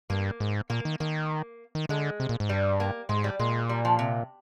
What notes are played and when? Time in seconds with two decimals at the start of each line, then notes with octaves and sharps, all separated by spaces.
0.10 G2 A#3
0.40 G#2
0.70 A#2 A#3
0.85 D#3
1.00 D#3 A#3
1.75 D#3
1.89 D3 G#3
2.20 C3
2.29 A#2
2.40 G#2
2.49 G2 G3
2.80 A#3
3.09 G#2 G#3
3.24 G3
3.39 A#2 G#3
3.69 G3
3.85 F3
3.99 C3